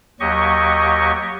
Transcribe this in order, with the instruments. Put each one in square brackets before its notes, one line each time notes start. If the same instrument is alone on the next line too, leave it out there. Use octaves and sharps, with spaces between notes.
[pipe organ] D#2 F#3 G4 D#5 C#6